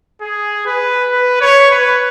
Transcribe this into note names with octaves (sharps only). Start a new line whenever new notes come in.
G#4
B4
B4
C#5
B4